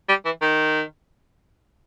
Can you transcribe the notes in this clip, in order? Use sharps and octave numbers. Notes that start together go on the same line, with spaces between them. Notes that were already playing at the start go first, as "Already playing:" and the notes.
G3
E3
D#3